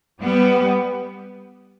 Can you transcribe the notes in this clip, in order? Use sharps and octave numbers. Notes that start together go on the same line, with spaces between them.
G3 B3